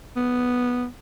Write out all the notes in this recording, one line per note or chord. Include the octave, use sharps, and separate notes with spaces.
B3